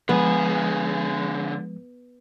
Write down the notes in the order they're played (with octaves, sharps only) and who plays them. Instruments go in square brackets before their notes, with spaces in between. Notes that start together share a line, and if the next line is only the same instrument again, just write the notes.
[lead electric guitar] D3 G#4 [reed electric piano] F3 G#3 [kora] B3